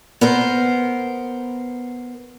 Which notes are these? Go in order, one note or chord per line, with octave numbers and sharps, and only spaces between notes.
B3 A#4 C5